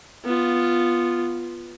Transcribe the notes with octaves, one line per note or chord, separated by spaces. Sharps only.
B3 F4